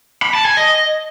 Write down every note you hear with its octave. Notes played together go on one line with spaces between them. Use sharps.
B5
A5
G#5
D#5